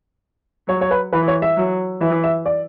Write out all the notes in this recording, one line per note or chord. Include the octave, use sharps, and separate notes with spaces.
F#3 C#5
C#5
B4
E3 B4
C#5
E5
F#3
E3 E5
E5
D5